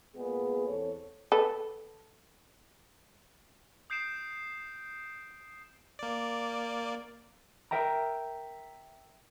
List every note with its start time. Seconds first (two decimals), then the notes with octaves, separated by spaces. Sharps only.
0.15 A#2 G#3 B3 G#4
0.67 E2 C4 A4 C5 C#5
1.32 A4 B4
3.90 D#6 G6 C7 D7 E7
5.99 A#3 D5
7.71 A#4 E5 G5 A#5